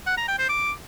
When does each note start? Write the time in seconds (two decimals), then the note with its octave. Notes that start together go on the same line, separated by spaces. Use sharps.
0.07 F#5
0.17 A#5
0.28 G5
0.38 C5
0.49 D6